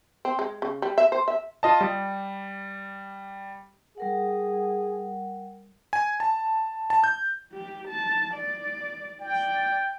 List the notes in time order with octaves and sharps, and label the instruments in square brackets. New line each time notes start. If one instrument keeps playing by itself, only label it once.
[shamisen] C4
G#3
C#3
G3
E5
C5
E5
[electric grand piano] F4 D#5 A5
G3
[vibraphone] G3 A#4 F#5 [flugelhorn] G#4
[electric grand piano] G#5
A5
A5
G6
[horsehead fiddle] G4
A5
D5
[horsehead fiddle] D5 [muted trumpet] G5